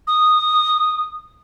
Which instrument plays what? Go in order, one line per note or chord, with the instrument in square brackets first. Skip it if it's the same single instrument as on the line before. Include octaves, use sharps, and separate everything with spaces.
[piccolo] D#6